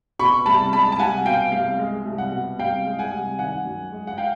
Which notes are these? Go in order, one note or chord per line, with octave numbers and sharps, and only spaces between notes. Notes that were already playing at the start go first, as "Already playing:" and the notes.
B2 B5 C#6
C2 A5 B5
G#3 A5 B5
A5
C2 F#5 G#5
B2 F5 G5
C2 F5
G#3
C2
F#5
B2
C2 F5 G5
G#3
F#5 G#5
C2
D#3 F#5 G#5
F#2
G#3
F#5
F5 G5